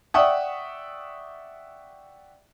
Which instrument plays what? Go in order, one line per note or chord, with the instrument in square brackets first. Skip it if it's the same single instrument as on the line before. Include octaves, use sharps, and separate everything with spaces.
[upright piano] D5 E5 F#5 G5 C#6 D#6